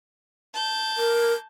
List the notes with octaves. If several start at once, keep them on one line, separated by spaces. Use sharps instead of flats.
A5 G6
A#4